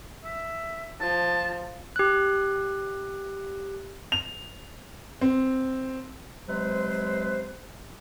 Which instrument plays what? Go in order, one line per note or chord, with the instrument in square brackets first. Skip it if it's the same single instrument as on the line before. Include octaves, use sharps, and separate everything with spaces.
[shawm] E5
[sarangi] F3 [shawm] A5
[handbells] G4 F#6
[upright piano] F7
C4
[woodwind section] C3 F#3 G#3 B4 C5